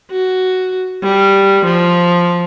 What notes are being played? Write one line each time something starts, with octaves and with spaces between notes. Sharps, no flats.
F#4
G3
F3